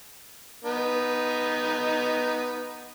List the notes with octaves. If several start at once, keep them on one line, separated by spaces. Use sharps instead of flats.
B3 D#4